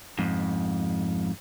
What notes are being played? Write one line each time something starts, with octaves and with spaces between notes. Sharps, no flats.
F2 G#2